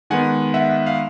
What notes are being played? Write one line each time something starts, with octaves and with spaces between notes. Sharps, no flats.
D#3 G#3 B3 F#5 G#5
E5 F#5
F5